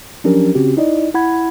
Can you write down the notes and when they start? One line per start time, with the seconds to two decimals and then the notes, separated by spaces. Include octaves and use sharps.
0.24 F3 F#3 C#4 D4 G4 A#4
0.55 C#3 C4 C#4 F#4 G4
0.77 D#4 E4 D5 D#5
1.14 E4 F#5 B5 G#6